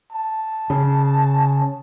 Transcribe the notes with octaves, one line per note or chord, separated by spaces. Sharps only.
A5
C#3